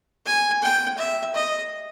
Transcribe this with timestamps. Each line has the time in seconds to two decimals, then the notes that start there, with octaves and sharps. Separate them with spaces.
0.26 G#5
0.62 G5
0.98 E5
1.34 D#5